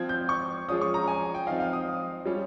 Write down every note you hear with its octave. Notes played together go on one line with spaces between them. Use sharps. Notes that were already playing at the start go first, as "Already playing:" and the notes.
Already playing: F3 C4 F4 G#6
G6
C#6
F3 G#3 C#4 F4 D#6
C#6
A#5
G#5
G5
F3 C4 D#4 F5
F5
D#6
G3 C#4 F4